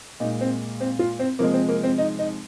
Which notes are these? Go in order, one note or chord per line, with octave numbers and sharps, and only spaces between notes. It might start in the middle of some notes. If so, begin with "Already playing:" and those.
A#2 G#3 D#4
C4
C4
F4
C4
C3 F3 G#3 A#3
C4
A#3
C4
D#4
D#4